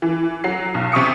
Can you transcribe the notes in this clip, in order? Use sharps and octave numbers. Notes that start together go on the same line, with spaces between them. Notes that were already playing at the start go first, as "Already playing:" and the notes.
E3
F#3 C7
B1
C3 C#6 D#6 C#7